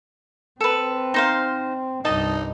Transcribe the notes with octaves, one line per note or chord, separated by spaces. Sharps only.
C4 A4 B4
D#4 C5 F5
C2 G2 D#4 D#5 A5